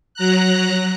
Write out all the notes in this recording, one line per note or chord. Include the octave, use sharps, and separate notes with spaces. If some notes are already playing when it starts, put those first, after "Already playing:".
F#3 A#5 F#6